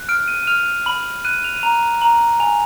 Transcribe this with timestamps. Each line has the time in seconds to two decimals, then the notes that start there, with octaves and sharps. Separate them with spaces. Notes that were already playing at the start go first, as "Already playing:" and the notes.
Already playing: F#6
0.09 F6 D7
0.28 D#7
0.42 D#7
0.47 F6 F7
0.86 B5 F#7
1.25 F#6 D#7
1.44 F7
1.56 D#7
1.63 A#5 F7
2.01 A#5 F#7
2.40 G#5 F7